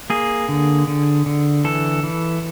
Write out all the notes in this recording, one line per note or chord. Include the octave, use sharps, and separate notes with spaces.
A#3 G#4
D3
D3
D3
E3 A4
E3